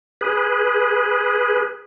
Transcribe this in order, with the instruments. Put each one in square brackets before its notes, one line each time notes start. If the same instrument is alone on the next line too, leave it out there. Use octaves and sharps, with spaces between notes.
[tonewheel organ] G#4 B4